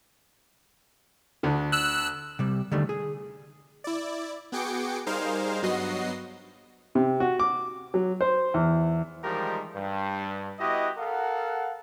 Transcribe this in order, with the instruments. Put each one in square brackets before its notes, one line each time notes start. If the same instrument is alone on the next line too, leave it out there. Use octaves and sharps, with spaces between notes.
[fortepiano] D2 D3
[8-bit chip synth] E6 F#6
[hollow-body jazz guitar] C3 G3
D3 D#3 G3 A3
G#4
[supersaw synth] E4 D5
B3 F#4 G#4 G5 D6 C#7
G3 D#4 G#4 A#4 C5 F5
G2 F#3 B3 F#4 D#5 C7
[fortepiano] C3
F#4
D6
F#3
C5
E2
[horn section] D#3 F3 G3 G#3 G4 A#4
G2
B3 E4 F#4 G4 D#5
A4 A#4 F5 F#5